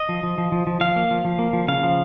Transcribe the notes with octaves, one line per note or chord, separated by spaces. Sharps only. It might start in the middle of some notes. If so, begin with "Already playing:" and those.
Already playing: D#5
F3
F3
F3
F3
F3
F3 F5
A#3
F3
F3
A#3
F3
C#3 F5
F3